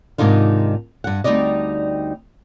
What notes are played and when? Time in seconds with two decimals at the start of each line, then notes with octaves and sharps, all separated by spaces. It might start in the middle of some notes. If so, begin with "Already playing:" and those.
0.18 G#2 C3 D#3 D4 D#4 F4
1.04 G2 F#5
1.24 D2 G3 C4 D#4 D5 D#5